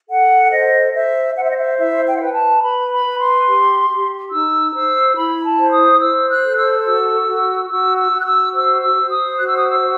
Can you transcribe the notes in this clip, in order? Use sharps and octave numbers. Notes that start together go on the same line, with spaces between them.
A4 F#5
C5 D#5
C5 E5
C5 F#5
E5
D#5
E5
E4 E5
G5
F#5
B4 G5
A5
B4 B5
B5
B4
C6
G4
G4
D#4 E6
C5 E6
E4 B5
A5
C5
D#6
C5 E6
F#6
A4
E6
F#4 E6
F#4
F#4 E6
E6
F#4
F#6
E6
C5 E6
E6
C5
D#6
F#4 F#6
E6
D#6
E6
C5